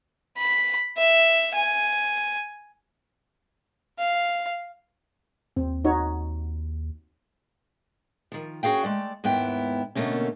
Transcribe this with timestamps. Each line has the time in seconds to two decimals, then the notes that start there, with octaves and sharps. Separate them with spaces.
0.37 B5
0.98 E5
1.55 G#5
3.99 F5
5.56 D#2 C4
5.85 D#4 F#4 C#5
8.32 D#3 F3
8.63 C#4 F#4 G#4 F5 G5
8.84 G#3 A3 D5
9.24 D#2 G#2 B3 E4 G5
9.95 B2 D3 A3 A#3 C#4